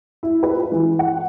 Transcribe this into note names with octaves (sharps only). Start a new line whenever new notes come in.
E4
B4
F4
E3
F#5